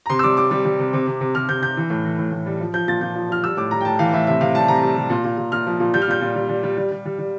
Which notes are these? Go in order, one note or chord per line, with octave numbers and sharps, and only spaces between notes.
A#5
C3 C6
E6
G3 D6
G3 D6
G3
G3
C3
C3
C3
C3
C3 F6
C3 G6
C3 G6
E3
A2
E3
A2
A2
G3
F3
F3 G6
A#2 A6
A#2 G6
F3
F3 F6
G3 E6
A2 D6
G3 A#5
G5
A2 A5
E3 F5
A2 E5
C3 E5
C3 F5
G3 A5
C3 A#5
G3
C3
A#2
A#2
A#2
A#2 F6
F3
A#2
G3 G6
F6
A#2 G6
A#2
G3
G3
G3
G3
G3
G3
G3